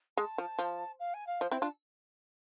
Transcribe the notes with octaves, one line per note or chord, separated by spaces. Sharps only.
G#3 A5
F3
F3
F5
G#5
F5
F3 C5
C4 E4 C5
D4 F4 A5